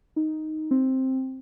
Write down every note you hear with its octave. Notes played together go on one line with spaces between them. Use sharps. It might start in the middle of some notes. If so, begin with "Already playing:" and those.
D#4
C4